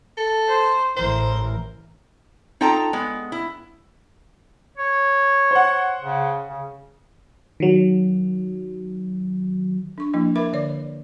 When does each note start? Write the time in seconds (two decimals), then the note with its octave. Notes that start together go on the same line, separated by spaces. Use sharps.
0.18 A4
0.48 C5
0.97 A1 A2 E3 A#4 C5
2.61 D#4 F4 A4 G5 A5 A#5
2.93 G#3 B3
3.32 E4
4.78 C#5
5.51 C5 F#5
6.02 C#3
6.48 C#3
7.60 D#3 F#3
9.98 D4 C#6
10.13 F3 A#3 D4 E4
10.36 A#4 B4 E5 B5 D6
10.53 D3 B4 C#5 D5
10.69 D5